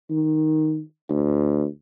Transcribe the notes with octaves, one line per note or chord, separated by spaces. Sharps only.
D#3
D2